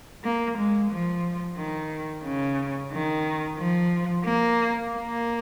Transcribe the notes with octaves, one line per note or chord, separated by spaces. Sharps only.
A#3
G#3
F3
D#3
C#3
D#3
F3
A#3
A#3